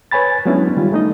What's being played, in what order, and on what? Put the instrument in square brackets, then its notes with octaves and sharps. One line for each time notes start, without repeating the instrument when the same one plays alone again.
[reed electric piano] B4 C#5 G#5 B5 A6
F#3 G#3 B3 C#4 D4 E4
D#3 G3 F4
A3 D#4 D#5